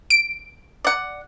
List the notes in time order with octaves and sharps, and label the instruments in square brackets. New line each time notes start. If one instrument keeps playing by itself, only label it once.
[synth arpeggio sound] D7
[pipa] D5 F#5